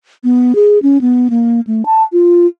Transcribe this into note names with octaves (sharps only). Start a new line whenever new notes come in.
B3
G#4
C#4
B3
A#3
A3
A5
F4